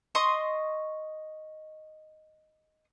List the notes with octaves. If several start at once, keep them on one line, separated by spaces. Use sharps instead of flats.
D#5 C6 C#6 D#6